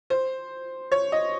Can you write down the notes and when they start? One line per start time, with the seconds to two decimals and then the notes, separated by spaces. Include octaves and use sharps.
0.10 C5
0.92 C#5
1.12 D#5